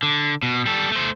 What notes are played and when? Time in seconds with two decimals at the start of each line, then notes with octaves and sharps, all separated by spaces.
0.03 D3
0.43 B2
0.66 G3 A4
0.92 A3 C5